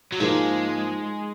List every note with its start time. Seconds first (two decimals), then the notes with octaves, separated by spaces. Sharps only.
0.12 F#3
0.20 G#2 F3 G#3 A#3